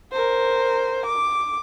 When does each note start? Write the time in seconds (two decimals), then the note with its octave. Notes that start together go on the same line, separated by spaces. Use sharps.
0.12 A#4 C5
1.07 D6